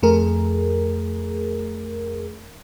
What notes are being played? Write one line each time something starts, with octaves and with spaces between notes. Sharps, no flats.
F2 A3 G#4 A#4